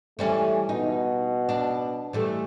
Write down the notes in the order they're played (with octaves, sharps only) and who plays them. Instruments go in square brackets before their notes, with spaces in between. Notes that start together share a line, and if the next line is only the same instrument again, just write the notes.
[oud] E3 G3 C#4 [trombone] A3
[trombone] B2 [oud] D#4
[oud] D4
E3 G3 A3